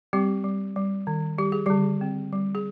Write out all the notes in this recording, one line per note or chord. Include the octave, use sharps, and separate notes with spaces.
G3 C4 G4
G3
G3
D#3
G3 G4
G#4
D3 G3 G4
C4
G3
G#4